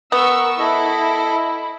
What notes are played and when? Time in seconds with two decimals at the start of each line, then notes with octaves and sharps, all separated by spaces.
0.12 B3 A#4 C#6 E6
0.59 E4 A4 D#5